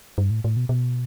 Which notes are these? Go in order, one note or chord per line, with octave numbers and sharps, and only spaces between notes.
G2
A2
A2
B2
B2